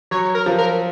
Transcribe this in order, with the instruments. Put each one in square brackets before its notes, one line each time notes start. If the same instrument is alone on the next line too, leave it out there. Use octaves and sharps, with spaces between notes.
[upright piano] F#3 [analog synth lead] C#5
[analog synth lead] A#4
[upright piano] F3
[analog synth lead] A#4